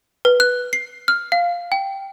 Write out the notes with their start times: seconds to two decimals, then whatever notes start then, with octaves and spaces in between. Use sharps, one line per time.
0.25 B4
0.40 F#6
0.73 C7
1.08 F6
1.32 F5
1.72 G5